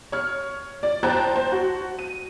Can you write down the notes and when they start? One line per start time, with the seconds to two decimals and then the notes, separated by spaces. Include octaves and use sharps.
0.12 C#5 F6
0.83 D5
1.03 C5 G5 A5 A#5 F#6 A6
1.36 C5
1.52 F#4
1.99 D#7